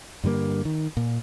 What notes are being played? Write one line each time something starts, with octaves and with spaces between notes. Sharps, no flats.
G2 D3 G3 A#3
D#3
A#2